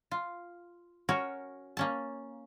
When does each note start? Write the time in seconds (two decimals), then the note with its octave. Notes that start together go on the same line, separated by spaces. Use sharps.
0.11 F4
1.09 C#4 F#4 A#4 C#5
1.77 A#3 C#4 A5